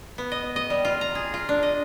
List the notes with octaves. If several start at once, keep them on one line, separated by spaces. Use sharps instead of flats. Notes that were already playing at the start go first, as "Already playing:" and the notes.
B3
D#5
D#5
G3
F4
A#5
G#4
F4
D4
D#5